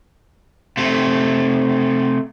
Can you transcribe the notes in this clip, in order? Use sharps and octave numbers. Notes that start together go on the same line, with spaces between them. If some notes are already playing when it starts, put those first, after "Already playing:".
C3 A3